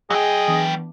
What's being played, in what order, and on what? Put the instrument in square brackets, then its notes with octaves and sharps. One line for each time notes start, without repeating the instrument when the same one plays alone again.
[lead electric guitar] F#3 G5 [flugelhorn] G#4 [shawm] D#5 [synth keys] F#5
[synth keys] E3 B3 D4